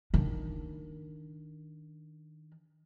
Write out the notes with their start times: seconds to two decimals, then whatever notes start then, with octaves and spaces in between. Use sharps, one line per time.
0.14 D#3 D4